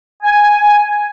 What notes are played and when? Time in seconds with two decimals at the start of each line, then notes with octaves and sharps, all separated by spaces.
0.23 G#5